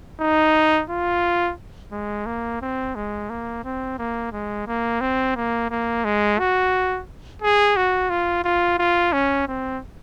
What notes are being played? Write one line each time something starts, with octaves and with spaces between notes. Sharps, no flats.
D#4
F4
G#3
A#3
C4
G#3
A#3
C4
A#3
G#3
A#3
C4
A#3
A#3
G#3
F#4
G#4
F#4
F4
F4
F4
C#4
C4